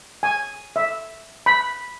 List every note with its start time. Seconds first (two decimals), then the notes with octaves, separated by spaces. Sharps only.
0.23 G#5
0.76 E5
1.46 B5